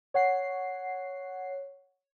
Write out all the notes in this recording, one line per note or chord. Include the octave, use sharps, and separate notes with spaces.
C#5 F#5 C7